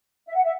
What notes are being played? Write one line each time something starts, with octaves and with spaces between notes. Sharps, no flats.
E5
F#5
E5